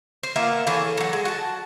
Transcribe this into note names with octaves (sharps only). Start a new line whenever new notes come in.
C5
A#3 B3 F4 E5
E3 G#4 A4 C#5
F#3 F#4
G#3
F#4 A5